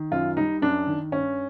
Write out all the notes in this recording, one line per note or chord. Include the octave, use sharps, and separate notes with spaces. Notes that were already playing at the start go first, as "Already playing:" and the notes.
Already playing: D#3
F#2 F4
G3 D#4
F#2 D4
D#3
G2 C#4